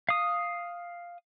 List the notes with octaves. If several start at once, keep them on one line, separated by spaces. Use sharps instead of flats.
F5 D#6